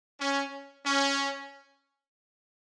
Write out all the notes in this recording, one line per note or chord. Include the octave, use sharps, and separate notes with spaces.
C#4
C#4